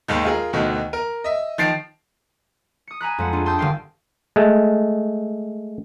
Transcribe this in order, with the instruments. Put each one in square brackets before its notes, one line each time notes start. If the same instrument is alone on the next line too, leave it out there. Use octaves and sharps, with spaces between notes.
[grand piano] D#2 G#2 D#3
F4 G#4 A#4
D2 B2 D3 D#3
A#4
D#5 E5
D#3 F3 A6 C7 D7
[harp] D#6 C#7
G#5 A#5 B5 F#6
F2 G#3 F#5
D4 F4 G#4 A4
G5 A5 C6 D#6 E6 G6
G1 D#3 F5 G5 C6 D7
[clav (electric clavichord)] G#3 A3